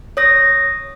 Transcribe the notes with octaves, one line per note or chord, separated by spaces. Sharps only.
C#5 D#6 A#6